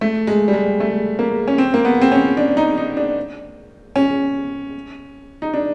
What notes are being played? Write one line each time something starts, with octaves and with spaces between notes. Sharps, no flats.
A3
G#3
G3
G#3
A3
A#3
C#4
C4
A#3
B3
C4
C#4
D4
D#4
D#4
D4
C#4
D#4
D4